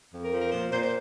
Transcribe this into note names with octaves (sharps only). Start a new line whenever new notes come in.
F2
A#4
F3
A#4
A#2 C5
A#2 C5
C5